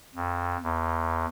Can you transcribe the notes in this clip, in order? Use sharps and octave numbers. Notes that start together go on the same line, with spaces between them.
F2
E2